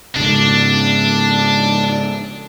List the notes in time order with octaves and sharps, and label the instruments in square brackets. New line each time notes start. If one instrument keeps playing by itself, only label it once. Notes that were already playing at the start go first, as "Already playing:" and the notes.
[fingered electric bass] G#2 C#3 [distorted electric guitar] D4